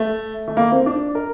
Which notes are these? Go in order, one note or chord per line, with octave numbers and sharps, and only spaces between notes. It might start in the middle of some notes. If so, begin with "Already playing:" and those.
Already playing: A3
A3
A#3
C4
D4
A#4